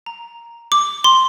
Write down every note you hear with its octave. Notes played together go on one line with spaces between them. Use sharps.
A#5
D6
C6